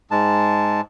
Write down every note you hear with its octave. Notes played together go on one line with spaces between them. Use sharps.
G#2 G#3 A5